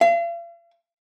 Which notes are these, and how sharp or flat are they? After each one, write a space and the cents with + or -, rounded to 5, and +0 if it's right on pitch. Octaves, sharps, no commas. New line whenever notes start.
F5 -45